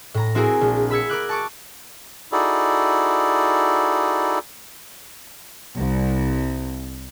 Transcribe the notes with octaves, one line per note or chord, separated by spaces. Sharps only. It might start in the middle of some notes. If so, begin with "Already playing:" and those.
A2 A#5
C4 E4 F#4 G#4 A#4
A#1
B5 E6 G#6 C#7
A#4 D6 F#6
A5 C#6 D6
D#4 E4 F#4 G#4 A4 D5
C2